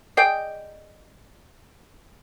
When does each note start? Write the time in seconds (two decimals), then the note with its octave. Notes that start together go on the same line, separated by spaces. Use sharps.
0.17 G#4 D5 D#5 G5